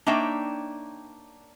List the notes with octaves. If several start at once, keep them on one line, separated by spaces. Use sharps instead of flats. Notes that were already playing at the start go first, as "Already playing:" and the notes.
A#3 D4 D#4 C#5 E5 G5